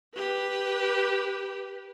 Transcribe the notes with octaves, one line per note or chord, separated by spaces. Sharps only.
G4 B4